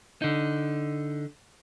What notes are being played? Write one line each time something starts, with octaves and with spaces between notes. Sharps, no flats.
D3 D#4